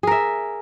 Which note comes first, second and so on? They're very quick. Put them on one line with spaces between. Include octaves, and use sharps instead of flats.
G#4 A#4 E5